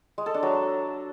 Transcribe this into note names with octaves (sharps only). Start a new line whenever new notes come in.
G#3
A4
D4
F#3